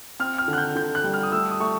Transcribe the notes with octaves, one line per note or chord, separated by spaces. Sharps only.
C4 F6
F6
D3
F#6
G6
D3 G6
F#6
G3
F6
D#6
A3 E6
D#6
A3 C#6